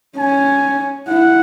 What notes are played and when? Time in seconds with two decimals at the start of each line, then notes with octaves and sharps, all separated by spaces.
0.18 C#4 G#5
1.08 E4 F#5